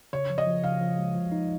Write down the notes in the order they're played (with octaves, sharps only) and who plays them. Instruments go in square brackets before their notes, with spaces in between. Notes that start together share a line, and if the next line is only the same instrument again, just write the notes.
[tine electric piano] C#3 [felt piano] C#5
[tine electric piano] F3
[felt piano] D#5
[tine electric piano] F3
[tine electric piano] C#3 [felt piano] F5
[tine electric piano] F3
G#3
F3
D#4